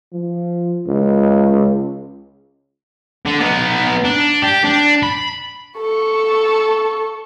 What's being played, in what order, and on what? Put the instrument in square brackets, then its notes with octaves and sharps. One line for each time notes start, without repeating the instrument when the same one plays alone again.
[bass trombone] F3
C#2
[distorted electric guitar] D3 D4
B3 D#4
D4
G4
D4
B5
[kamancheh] A4 C#6